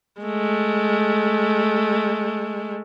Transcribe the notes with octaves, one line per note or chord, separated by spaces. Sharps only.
G#3 A3